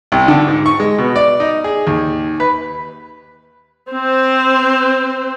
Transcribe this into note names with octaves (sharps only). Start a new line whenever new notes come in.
C2
D3
G#2
C#6
G#3
B2
D5
D#4
G#4
D#2
B4
C4 C5